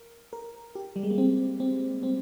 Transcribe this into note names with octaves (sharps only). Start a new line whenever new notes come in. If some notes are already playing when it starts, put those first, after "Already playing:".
Already playing: A#4
A#4
G4
G3
G#3
A#3
C4
C4
C4